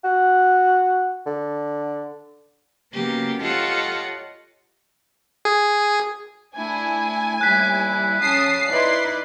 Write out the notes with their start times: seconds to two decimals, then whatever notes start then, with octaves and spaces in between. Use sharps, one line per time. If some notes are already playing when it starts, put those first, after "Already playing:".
0.04 F#4
1.26 D3
2.94 C#3 F#3 A#3 B3 G4
3.43 F4 G4 A4 C#5 D#5 F#5
5.45 G#4
6.56 A3 D4 E4 G#5
7.41 D#2 G3 E4 F#6 B6
8.21 C#3 A5 D#6 C7
8.70 D#4 E4 B4 D5 C6